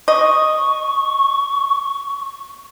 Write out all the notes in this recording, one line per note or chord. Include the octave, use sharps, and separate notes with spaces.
D#5 C#6